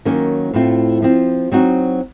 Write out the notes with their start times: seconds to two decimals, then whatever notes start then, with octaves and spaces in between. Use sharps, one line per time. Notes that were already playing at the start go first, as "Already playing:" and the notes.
0.05 D#3 F#3 A#3 C#4
0.53 A2 A3 C4 F4
1.02 F3 C4 F4
1.52 F#3 C4 D#4 F#4